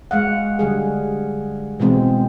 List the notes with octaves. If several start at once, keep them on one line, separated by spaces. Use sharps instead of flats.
G#3 F5 F#5
D3 G3 G#4
B2 E3 G#3 C4